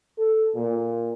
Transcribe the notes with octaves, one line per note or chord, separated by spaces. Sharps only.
A4
A#2